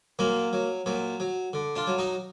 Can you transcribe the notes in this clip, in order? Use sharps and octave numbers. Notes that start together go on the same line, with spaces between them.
A#2 F#3 A#3
F#3
A#2 F#3
F#3
D3
D4 F4
F#3
D#4 F#4